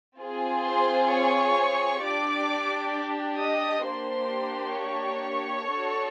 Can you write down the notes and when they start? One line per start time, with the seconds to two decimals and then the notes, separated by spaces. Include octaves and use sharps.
0.19 C4 F4 G#4
0.65 C5 C6
1.11 C#5 C#6
2.03 D4 G4 D5 D6
3.42 D#5 D#6
3.88 A#3 D4 G4 C5 C6
4.80 C#5 C#6
5.72 D4 F#4 A4